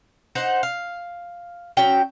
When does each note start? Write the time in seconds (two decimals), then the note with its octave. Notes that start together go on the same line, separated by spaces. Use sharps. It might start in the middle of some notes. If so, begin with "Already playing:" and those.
0.35 D#4 C5 F#5
0.63 F5
1.77 F#3 C#4 G5